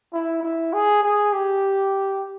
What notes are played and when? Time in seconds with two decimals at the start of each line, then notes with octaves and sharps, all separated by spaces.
0.13 E4
0.43 E4
0.73 G#4
1.03 G#4
1.33 G4